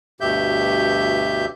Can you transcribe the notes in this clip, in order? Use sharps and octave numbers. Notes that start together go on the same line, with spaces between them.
D2 G2 B2 G4 E5 G6